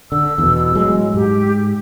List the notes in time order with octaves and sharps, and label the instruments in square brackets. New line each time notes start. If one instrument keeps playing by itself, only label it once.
[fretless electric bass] D3 [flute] E6
[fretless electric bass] E2 B2
A2 F#3 G#3
[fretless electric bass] G#2 [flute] G4